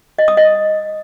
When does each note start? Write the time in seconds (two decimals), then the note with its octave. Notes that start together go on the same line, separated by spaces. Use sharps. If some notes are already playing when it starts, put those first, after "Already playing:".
0.19 D#5
0.28 D#6
0.37 D#5